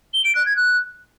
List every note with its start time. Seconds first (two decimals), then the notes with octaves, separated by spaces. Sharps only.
0.14 G7
0.25 D7
0.35 F#6
0.46 G#6
0.57 F#6